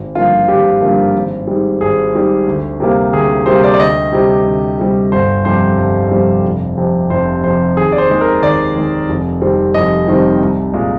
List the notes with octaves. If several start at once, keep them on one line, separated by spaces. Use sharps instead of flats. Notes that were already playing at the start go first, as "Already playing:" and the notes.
Already playing: G#1
G2 D3 F3 A#3 F4
G#1 G4
G2 D3 F3 A#3
G#1
G#2 G3
G#1 G#4
G#2 G3
D2
C3 G3 A#3
D2 G#4
C3 G3 A#3 C5
D5
D5
D2 D#5
C3 G3
D2
C3 G3
G1 C5
F2 C3 G3 C5
G1
F2 C3 G3
F1
F2 C3
F1 C5
F2 C3 C5
D#2 G#4
D5
C5
D#3 G#3
A#4
D#2 D5
D#3 G#3
F1
F2 D#3 G3 C4
F1 D#5
F2 D#3 G3 C4
C2
A#2 G#3